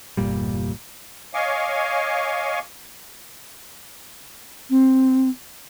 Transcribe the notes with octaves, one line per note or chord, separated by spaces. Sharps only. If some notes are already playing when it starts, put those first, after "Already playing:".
G1 E2 A#2 G3
C#5 D#5 F5 G#5 C#6 D6
C4